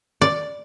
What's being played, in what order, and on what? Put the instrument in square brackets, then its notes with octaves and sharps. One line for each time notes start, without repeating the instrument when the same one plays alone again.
[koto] D5